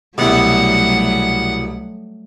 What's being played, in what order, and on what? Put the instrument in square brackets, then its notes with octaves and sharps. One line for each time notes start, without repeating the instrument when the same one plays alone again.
[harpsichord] C2 B2 [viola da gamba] F#3 G3 A3 [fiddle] F#5